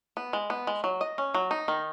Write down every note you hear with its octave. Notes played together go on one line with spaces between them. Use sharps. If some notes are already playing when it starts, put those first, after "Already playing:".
B3
G#3
B3
G#3
F#3
D#5
C#4
F#3
D#4
D#3